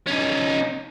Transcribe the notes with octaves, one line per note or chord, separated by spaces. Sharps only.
C#4 D#4